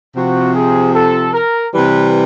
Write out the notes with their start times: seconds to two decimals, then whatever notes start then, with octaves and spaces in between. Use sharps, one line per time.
0.15 C3 F3 F#4
0.55 G#4
0.94 A4
1.32 A#4
1.73 C3 E3 G3 B4